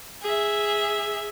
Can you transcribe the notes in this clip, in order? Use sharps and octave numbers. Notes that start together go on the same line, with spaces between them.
G#4 E5